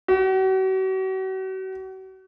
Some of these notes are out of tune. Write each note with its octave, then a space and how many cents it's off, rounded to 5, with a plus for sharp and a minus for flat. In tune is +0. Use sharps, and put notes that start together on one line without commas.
F#4 +40